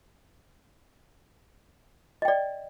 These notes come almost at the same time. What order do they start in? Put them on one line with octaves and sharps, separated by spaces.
D#5 G5 D5